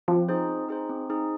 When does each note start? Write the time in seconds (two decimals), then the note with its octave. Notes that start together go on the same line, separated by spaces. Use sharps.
0.08 F3 C4
0.29 D#4 G#4 C5
0.48 C4
0.69 D#4 G#4 C5
0.89 C4
1.10 D#4 G#4 C5